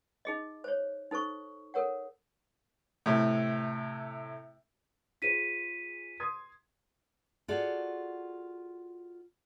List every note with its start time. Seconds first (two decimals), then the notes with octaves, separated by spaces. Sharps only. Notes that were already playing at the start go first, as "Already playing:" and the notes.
0.25 D#4 G#4 D#5
0.64 C5 C#5
1.11 D#4 A4 C5 C#6
1.74 A4 A#4 C#5 F#5
3.06 A2 C3
5.22 F4 G#4 C5 B6 D#7
6.20 C6 D#6 G#6
7.48 F4 F#4 G#4 A4 D5 F#5